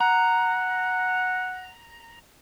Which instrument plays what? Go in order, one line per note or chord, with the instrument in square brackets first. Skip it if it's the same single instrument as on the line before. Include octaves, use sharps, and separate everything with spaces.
[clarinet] F#5 [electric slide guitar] A#5